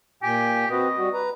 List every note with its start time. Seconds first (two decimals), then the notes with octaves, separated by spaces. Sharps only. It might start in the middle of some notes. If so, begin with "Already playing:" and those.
0.23 A#2 G4 G5 G#5
0.70 C4 F#4 B4 D#5
0.98 G3 F#4
1.14 B4 A#5